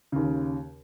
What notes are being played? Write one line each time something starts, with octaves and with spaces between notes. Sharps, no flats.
D#2 C#3